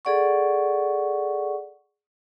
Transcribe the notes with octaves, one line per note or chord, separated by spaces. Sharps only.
G#4 A4 D5 F#5 C#6